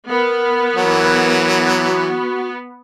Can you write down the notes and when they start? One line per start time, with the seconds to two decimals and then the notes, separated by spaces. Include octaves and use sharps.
0.10 B3 A#4
0.76 E3 F#3
1.84 F#4